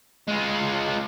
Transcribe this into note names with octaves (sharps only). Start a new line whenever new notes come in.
G#3 F4